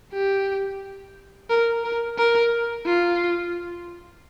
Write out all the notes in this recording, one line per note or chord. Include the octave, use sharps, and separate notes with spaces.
G4
A#4
A#4
A#4
F4